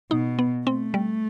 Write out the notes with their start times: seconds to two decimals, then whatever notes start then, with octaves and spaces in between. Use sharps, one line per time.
0.11 B2 D#4
0.39 B3
0.67 A3 C4
0.94 G3